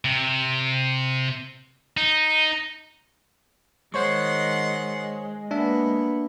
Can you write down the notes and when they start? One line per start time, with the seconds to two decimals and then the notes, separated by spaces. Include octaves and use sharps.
0.05 C3
1.97 D#4
3.94 D#3 G#3 C5 C#5 F#5 C6 C#6
5.51 A#3 B3 D4 E5